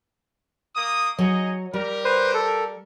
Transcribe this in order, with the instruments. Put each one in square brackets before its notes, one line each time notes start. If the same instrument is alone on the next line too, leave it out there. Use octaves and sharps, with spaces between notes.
[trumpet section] A#3 D#6
[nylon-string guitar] F#3 C#5 [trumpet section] D#4 G#4 D#5
[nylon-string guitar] G3 [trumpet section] G4 A#4
[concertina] B4 C5
A4